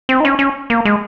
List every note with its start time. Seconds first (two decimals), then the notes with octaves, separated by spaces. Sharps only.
0.09 C4
0.20 D#4
0.25 C#4
0.39 C#4
0.70 A#3
0.85 G#3